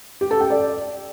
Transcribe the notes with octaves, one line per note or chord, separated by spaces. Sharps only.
G4
A4
G5
D5